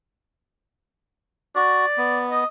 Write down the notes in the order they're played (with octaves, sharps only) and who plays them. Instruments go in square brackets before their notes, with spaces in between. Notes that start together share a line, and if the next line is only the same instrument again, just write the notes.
[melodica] F#4 [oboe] D5
[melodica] B3
[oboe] D#5